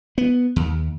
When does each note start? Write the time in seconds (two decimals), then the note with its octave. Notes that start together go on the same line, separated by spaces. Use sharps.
0.18 B3
0.56 D#2